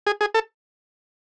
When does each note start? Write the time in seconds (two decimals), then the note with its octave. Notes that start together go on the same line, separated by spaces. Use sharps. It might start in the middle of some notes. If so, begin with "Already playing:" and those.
0.07 G#4
0.21 G#4
0.34 A4